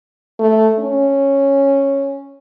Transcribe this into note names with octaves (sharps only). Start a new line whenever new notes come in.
A3
C#4